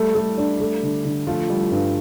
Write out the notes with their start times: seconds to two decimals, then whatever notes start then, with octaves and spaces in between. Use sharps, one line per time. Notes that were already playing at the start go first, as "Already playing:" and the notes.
Already playing: G3 A3
0.15 A3
0.38 D4
0.60 A3
0.83 D3
1.05 D3
1.27 F3 A3 F4
1.50 G3
1.72 G2